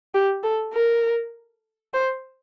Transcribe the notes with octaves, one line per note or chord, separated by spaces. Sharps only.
G4
A4
A#4
C5